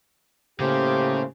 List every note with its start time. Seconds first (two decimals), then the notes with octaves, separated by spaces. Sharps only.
0.60 A2 C#3 A#3 G4 C5